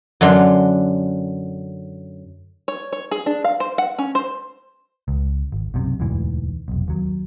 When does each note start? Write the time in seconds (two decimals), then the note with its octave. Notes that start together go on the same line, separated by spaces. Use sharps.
0.21 F#2 D3 F#3 D4 C6
2.68 C#5
2.92 C#5
3.11 G#4
3.26 D4
3.44 F5
3.60 C5
3.78 F#5
3.98 C#4
4.15 C5
5.08 C#2
5.52 G#1
5.74 B1 F#2 C3
6.00 E1 D2 G#2 E3
6.68 F1 B1
6.88 D#2 F#3